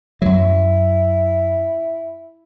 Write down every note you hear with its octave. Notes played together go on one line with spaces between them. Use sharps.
F#2 F#3 E4